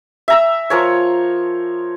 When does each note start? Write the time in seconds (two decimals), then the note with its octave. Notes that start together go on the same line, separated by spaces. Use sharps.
0.28 E5 A#5 E6
0.70 F3 A#4 C#5